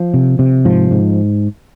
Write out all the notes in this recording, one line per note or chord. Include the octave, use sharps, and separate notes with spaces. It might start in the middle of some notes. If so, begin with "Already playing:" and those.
Already playing: F3
C3
C3
G#2 F3
G#2